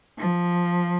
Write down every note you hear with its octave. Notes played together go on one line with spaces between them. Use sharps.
F3